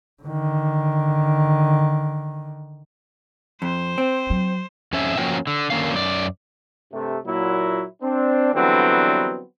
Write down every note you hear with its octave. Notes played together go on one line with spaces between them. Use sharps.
D3 D#3
F2 C5
C4
F#3
F2 C#4 C#5 E5
F3 A#3 C#4 F#4 A#4 G5
D3
D3 D#3 A#3 C#4 F5
F#2 D5
G2 C3 A3
A#2 F#3 E4
C4 D4
D3 E3 F#3 G3 B3 C4